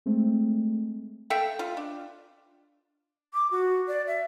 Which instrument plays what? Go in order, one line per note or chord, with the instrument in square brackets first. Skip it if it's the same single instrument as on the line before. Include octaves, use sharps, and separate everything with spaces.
[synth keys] G#3 A3 C4
[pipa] A4 E5 F5 G5
F4
D4
[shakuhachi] D6
F#4
D5
E5